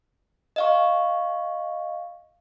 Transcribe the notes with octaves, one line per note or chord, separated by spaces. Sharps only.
D#5 F5 C#6